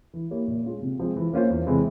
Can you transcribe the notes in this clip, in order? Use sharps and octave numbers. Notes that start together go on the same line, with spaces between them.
E3
A#3 E4 G4 C#5
A#2
G#3 C#4 F4
C3
F3 G#3 C4
E3
A#3 C#4 F4 C5
E2
C3 E3 G#3 E4